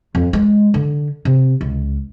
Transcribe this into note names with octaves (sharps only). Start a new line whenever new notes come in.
F2
G#3
D3
C3
C#2